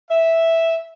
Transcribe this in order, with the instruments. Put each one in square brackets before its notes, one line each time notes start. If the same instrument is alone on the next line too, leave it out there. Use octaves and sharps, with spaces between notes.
[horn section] E5